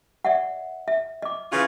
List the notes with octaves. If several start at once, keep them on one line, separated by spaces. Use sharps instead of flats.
D5 E5 F#5
E5
D#5 D6
C#3 E3 F4